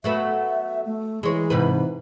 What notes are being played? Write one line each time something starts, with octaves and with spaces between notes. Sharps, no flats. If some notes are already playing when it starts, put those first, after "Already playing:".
F#3 A3 B3 E5
A3
E3 G#3 C#5
G#2 C3 B4